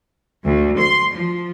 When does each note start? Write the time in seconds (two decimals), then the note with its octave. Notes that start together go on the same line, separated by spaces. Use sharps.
0.45 D2
0.79 C6
1.13 F3